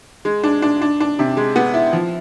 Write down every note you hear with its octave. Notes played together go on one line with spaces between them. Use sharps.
G#3
D4
D4
D4
D4
C3
G#3
B3
E4
F3